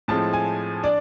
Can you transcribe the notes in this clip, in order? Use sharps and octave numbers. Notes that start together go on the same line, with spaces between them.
A2 F3 G#3 C4 A5
G#5
D4 D5